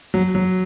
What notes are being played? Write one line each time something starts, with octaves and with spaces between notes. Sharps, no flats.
F#3
F#3